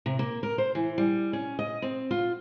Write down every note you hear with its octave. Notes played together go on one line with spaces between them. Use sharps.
C3
A#3
A#4
C5
E3
G3
C#4
D#5
C4
F4